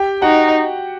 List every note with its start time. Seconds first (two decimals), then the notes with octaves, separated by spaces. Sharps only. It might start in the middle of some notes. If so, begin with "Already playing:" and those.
Already playing: G4 G5
0.22 D#4 F#4 F#5